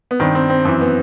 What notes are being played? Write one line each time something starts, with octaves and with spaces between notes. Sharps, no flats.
B3
G2 D#3 C4
C4
C4
F#2 E3 C4
B3